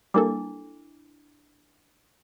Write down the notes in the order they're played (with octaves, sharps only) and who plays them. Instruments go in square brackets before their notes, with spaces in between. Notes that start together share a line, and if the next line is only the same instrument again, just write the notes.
[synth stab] G3 A#3 A4 [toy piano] D4 E4 D6